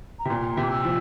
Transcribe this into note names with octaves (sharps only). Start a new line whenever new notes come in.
A#5
C3
A#2 C6
C3
D6
E6
F3